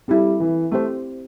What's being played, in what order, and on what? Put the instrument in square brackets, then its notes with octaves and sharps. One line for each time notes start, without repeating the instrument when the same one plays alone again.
[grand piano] G3 [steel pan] C4 E4 A4
[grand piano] E3
[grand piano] A3 [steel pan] C4 G4 C5